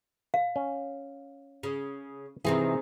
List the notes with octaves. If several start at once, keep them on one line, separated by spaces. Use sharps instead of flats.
F5
C#4
C#3
C3 D#3 E3 C4 G#4